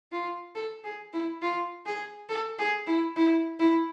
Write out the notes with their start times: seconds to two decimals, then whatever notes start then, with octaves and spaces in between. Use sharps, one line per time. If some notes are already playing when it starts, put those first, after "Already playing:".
0.12 F4
0.55 A4
0.84 G#4
1.13 E4
1.42 F4
1.86 G#4
2.29 A4
2.59 G#4
2.87 E4
3.16 E4
3.59 E4